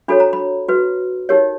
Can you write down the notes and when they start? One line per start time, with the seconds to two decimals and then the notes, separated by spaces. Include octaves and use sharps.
0.08 D4 F#4 A4 C#5 B5
0.20 A#5
0.33 B5
0.68 F#4 B4
1.29 D#4 G4 A#4 C#5